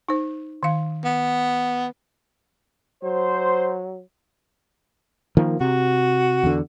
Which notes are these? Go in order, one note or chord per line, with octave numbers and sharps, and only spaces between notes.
D#4 C5
D#3 F5
B3
F#3 C5
D#3 F3 A#3
C3 F#4
E2 D3